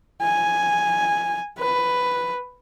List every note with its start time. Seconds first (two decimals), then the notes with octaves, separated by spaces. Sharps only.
0.22 G#5
1.59 B4